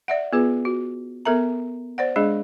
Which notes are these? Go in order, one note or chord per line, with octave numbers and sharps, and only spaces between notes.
D5 E5 F#5
B3 F4 G#4 B4
F#4
B3 A4 A#4 E5 A#5
C5 D5 F#5
G#3 D4 G#4 D#5